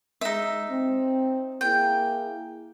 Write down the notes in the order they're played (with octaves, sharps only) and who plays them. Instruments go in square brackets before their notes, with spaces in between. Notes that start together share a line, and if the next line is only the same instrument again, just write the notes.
[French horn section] G#3 [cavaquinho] D#4 E5
[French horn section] C4
[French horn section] A#3 E4 G#4 [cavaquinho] G5